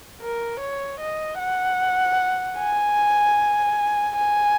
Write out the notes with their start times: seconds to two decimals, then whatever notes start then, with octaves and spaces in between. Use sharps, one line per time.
0.21 A#4
0.60 C#5
1.00 D#5
1.39 F#5
2.58 G#5
4.16 G#5